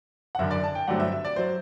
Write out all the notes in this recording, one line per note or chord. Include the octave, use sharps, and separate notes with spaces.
F#5
F#1 F#2 D3 E5
D5
A5
G5
G2 D3 F#3 A3 C4 F#5
E5
E5
D5
F#3 C5